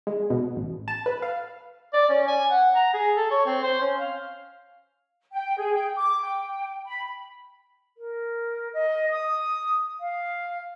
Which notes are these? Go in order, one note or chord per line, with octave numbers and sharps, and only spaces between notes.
G#3
B2
A1
A5
B4
F5
D5
C#4
G#5
F#5
A#5
G#4
A4
C#5
C4
C5
C#4
F5
G5
G#4
G5
D6
G5
B5
A#4
D#5
D#6
F5